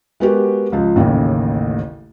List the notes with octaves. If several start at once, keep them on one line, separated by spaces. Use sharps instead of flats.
G#3 B3 F#4 G4 A#4
C#2 F3
A1 D#2 A2 C#3